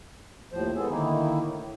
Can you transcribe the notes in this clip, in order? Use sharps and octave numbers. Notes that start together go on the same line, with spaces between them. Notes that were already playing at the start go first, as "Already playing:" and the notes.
D#2 A2 F3 C5
G#3 B3 G#4 A4
D3 D#3 A#3 D#4 E4
A2